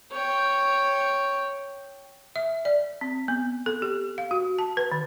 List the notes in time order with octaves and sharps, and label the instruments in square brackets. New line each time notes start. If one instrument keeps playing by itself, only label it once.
[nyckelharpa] C#5 G5
[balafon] E5
D5
C4
B3
A4
G4
F5
F#4
A5
B4
D#3